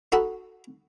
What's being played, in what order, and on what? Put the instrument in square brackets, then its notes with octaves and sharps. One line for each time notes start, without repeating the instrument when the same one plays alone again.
[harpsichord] D#4 F#4 A4 F#5 A5 B5